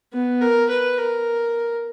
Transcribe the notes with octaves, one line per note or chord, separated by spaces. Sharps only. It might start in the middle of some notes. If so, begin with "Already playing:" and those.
B3
A#4
B4
A#4